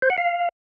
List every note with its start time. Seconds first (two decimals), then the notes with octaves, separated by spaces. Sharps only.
0.02 C5
0.10 F#5
0.18 F5